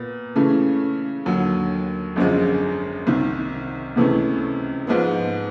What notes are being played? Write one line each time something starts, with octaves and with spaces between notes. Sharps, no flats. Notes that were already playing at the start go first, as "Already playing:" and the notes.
Already playing: A#2 B3
C#3 E3 A3 C#4
D#2 D3 F#3
G#1 F#2 D3 F3 G#3
C2 C3 D#3
C#2 C3 E3 A3 C#4
G#2 F3 G#3 B3